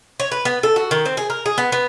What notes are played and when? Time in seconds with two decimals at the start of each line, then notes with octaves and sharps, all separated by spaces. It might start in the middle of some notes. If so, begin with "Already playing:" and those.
0.20 C#5
0.32 B4
0.45 B3
0.63 A4
0.76 F#4
0.91 D#3
1.05 C4
1.17 G#4
1.30 A#4
1.46 G#4
1.58 B3
1.72 B3